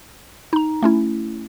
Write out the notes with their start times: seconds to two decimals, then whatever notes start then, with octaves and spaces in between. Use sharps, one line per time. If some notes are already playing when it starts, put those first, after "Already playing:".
0.53 D#4 A#5
0.83 A3 C#4 E4